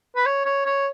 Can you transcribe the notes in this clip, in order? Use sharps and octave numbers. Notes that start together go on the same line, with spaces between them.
B4
C#5
C#5
C#5